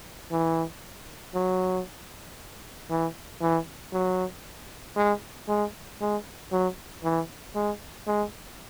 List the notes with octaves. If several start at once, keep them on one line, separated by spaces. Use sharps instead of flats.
E3
F#3
E3
E3
F#3
G#3
G#3
G#3
F#3
E3
G#3
G#3